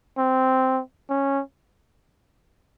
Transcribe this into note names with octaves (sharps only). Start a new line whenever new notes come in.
C4
C#4